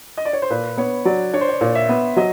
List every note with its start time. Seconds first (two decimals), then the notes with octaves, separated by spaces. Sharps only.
0.17 D#5
0.25 D5
0.33 C#5
0.42 C5
0.50 A#2 B4
0.77 B3 C#5
1.05 F#3 D5
1.33 D4 C#5
1.41 C5
1.49 C#5
1.61 A#2
1.75 E5
1.89 B3
2.17 F#3 D#5